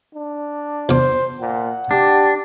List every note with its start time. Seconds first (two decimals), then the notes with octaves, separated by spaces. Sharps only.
0.15 D4
0.89 E2 C5 D6
1.41 A#2 F#5
1.91 D4 G4